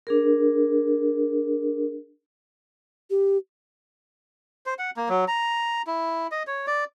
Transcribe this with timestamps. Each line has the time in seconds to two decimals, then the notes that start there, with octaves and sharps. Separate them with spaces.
0.07 D4 G#4 A#4
3.10 G4
4.66 C5
4.79 F#5
4.97 A#3
5.09 F#3
5.28 A#5
5.87 E4
6.31 D#5
6.47 C#5
6.67 D5